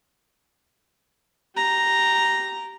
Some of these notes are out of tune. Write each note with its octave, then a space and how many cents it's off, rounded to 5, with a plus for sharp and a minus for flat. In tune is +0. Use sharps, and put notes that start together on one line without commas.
G4 -15 A#5 +0